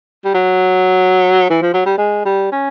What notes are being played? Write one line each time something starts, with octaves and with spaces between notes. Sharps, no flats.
G3
F#3
E3
F3
F#3
G3
G#3
G3
C#4